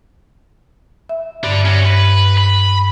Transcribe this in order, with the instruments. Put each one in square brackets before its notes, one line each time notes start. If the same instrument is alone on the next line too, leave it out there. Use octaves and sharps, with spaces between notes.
[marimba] E5
[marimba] G2 [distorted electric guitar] D3 D4
[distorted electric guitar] C#4 F#4
B4
B5